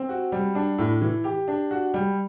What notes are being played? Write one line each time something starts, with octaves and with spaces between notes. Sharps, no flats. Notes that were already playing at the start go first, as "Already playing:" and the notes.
Already playing: C4
F#4
G3
D4
A2
E3
G4
D4
F#4
G3